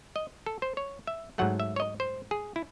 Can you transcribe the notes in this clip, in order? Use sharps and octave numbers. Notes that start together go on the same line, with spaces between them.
D#5
A4
C5
C#5
E5
G#2 F#3 A3 F#5
E5
C#5
D#5
C5
G#4
E4